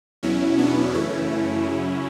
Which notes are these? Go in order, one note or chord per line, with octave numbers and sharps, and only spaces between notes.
E2 B2 F#3 C#4 E4
B3 D4
F#2 C#3 E3 A3 C#4 E4
F#2 C#3 F#3